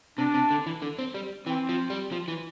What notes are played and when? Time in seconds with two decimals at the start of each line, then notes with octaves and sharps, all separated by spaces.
0.18 C3 D4
0.34 C3
0.51 D3
0.66 E3
0.82 D3
0.99 C4
1.14 G3
1.47 E3 C4
1.69 F3
1.90 G3
2.12 F3
2.28 E3